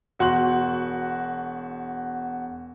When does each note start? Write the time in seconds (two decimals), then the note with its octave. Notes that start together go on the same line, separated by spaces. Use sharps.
0.19 E1 F#4 C6 F#6 F#7